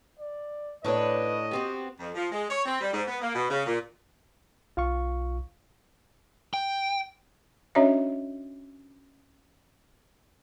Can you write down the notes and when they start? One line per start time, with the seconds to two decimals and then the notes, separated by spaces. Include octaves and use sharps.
0.19 D5
0.84 A2 D4 D#4 B4 C#5 D#5
1.51 B3 C4 F#4 G4
2.00 F2
2.15 F3
2.32 G#3
2.51 C#5
2.65 C4
2.81 G3
2.94 G#2
3.08 B3
3.22 A#3
3.34 B2
3.50 C#3
3.66 A#2
4.77 B1 F4 F5 C#6
6.54 G5
7.75 C#4 D4 F#4 C#5 D#5 E5